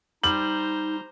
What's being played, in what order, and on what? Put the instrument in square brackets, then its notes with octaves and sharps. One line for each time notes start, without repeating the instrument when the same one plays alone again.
[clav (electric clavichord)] G3 [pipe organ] D#4 [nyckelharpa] C5 A#5 [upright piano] F#7